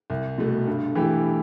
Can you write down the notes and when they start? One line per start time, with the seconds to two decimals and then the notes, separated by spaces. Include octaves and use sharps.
0.10 C2
0.38 B2 A3
0.67 G2
0.95 E3 A3 E4 G4